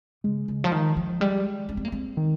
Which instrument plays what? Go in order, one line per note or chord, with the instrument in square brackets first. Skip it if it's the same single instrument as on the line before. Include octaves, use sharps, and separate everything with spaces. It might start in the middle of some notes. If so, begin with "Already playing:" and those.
[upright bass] C#3 [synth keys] G#3
[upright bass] C#3
F3
D#3
F3
[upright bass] G3 [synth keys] G#3
[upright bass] C#4
C4
A#3
C4
[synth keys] D#3